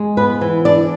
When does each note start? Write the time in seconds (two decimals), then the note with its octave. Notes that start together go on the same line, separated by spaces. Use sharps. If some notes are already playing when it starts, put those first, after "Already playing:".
Already playing: G#3
0.17 B3 B4
0.41 E3
0.65 D4 D5